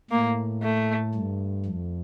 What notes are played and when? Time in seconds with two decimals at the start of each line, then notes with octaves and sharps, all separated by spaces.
0.11 A2 A#3
0.63 A3
1.14 G2
1.65 F2